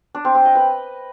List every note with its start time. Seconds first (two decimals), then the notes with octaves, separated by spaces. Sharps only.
0.15 D4
0.25 C4
0.35 C4
0.45 D#5
0.55 B4